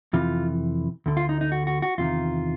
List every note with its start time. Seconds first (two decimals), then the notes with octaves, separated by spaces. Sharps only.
0.13 F2 C3 E3 F4
1.06 D2 D3
1.17 F4
1.29 D#4
1.41 D#4
1.52 F#4
1.67 F#4
1.82 F#4
1.98 E2 C3 D#3 F4